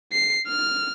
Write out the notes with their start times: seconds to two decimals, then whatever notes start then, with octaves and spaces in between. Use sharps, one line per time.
0.13 C7
0.48 F6